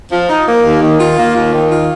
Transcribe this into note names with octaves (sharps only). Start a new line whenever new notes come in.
F3
D#4
A#3
D#2
D#3
F4
A#3
D#2
D#3
F4